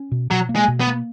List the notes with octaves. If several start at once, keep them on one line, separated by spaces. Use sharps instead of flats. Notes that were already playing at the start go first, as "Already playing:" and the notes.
Already playing: C#4
B2
B2 F#3
A#3
G#3
B2
B3
A#3